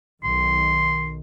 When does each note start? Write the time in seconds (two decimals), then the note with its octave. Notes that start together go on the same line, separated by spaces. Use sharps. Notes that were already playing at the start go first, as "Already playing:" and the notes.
0.24 B1 D#3 C6